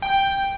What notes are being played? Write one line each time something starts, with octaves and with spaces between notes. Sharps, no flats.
G5